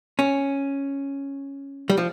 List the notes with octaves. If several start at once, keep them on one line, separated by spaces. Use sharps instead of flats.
C#4
G3
F3